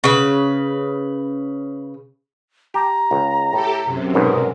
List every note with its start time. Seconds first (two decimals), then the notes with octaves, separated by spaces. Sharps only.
0.04 C#3 B4
2.74 G4 A5 A#5
3.11 C#2
3.53 A2 G4 A4
3.84 F#2 C3
4.14 B1 G#2 B2 A#4